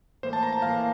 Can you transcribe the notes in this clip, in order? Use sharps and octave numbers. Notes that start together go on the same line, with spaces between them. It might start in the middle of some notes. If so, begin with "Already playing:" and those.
A2 E3 A#3 C5
A5
A#5
A5
A2 E3 A#3 F5